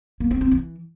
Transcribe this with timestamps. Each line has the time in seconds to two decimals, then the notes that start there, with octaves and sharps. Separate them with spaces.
0.20 A#3
0.31 C4
0.41 C4
0.51 E3